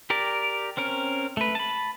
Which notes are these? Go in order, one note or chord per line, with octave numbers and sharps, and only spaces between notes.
G4 A#4 D5
C4 C#4 A#4
A3 B4
A5 B5